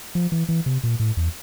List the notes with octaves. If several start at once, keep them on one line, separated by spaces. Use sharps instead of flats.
F3
E3
E3
C3
A#2
A2
E2